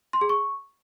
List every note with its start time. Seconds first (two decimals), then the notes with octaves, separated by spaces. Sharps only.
0.13 C6
0.21 G#4
0.29 C#6